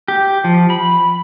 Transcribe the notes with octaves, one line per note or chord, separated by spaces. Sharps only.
G4
F3
B5